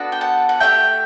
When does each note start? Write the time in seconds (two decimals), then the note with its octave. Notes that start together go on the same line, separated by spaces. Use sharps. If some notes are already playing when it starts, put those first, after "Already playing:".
Already playing: B3 D4 F#4 A4
0.12 G5
0.21 F#5 A5
0.49 F#5
0.60 A3 D4 G4 E5 G5